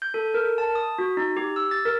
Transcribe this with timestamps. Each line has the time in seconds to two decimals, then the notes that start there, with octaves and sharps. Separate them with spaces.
0.02 G6
0.14 A4
0.34 A#4
0.58 A5
0.75 D#6
0.98 F#4
1.17 D#4
1.37 G4
1.56 E6
1.71 A6
1.85 A#4